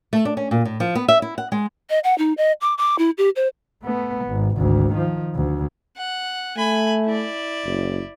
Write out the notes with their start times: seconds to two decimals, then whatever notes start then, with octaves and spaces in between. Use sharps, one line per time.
0.13 A3
0.25 D4
0.37 C#4
0.51 A#2
0.65 A2
0.80 F3
0.95 B3
1.08 E5
1.22 E4
1.38 F#5
1.52 G#3
1.90 D#5
2.04 F#5
2.18 D#4
2.37 D#5
2.61 D6
2.78 D6
2.99 E4
3.18 G4
3.36 C5
3.83 A3 B3
4.26 G#1
4.57 G#1 D2
4.94 D#3 F3
5.35 D2
5.97 F#5
6.58 A3 G#5 B5
7.05 E4 D5
7.65 F#1